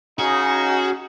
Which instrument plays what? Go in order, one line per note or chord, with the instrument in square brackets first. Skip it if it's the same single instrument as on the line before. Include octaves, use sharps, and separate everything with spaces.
[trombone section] C#3 D#4 [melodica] C#4 G#4 [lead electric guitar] F#4